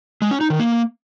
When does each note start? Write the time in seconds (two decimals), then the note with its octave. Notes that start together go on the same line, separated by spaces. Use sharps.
0.22 G#3
0.31 C#4
0.41 D#4
0.50 D#3
0.60 A#3